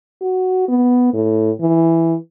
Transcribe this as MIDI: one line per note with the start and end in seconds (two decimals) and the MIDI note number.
0.21 0.66 66
0.68 1.12 59
1.13 1.51 45
1.61 2.15 52